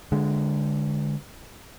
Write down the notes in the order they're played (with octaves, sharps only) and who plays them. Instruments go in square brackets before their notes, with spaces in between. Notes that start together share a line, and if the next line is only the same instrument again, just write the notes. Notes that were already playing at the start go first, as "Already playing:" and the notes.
[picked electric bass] D3 G#3